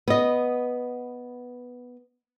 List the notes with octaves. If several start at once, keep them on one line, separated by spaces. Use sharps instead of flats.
B3 D#5